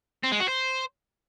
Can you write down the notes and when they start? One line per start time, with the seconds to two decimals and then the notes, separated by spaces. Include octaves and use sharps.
0.23 C4
0.32 G#3
0.40 F#4
0.48 C5